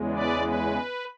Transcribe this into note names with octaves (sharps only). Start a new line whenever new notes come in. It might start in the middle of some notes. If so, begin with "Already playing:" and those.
Already playing: E2 C#3 G#3
B4 D5
B4